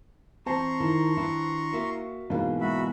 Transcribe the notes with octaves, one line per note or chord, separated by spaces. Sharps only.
E3 C4 C5 A5 A#5 C6 C#6
D#3 E4
D#3 D4 E4 B4
A#3 F#4 E5 F5
G#2 B2 E3 A#3 F4
G#3 F#4 E5 B5